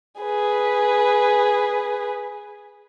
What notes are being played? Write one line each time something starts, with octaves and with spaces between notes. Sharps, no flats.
G#4 B4